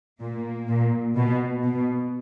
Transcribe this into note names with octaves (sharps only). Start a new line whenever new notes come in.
A#2 A#3
A#2
B2
B2